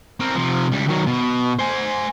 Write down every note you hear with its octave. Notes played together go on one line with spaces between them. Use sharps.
C4 A#4
C3 F3
C#2 G3
D#3 F#3
B2
C5 G#5